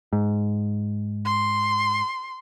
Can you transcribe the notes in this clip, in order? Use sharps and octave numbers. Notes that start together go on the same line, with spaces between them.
G#2
C6